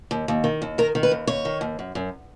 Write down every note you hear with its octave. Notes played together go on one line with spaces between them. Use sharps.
D#2
D#2
D#3
D#2
D#3 A#4
D#3
B4
D#2
D#2 C#5
D#3
D#2
F#2
F#2